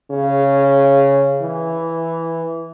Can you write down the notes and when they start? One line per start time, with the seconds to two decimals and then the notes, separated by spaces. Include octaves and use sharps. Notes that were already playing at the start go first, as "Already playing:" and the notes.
0.11 C#3
1.42 E3